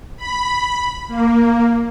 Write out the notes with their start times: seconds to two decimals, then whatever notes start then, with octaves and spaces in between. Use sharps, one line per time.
0.16 B5
1.08 A#3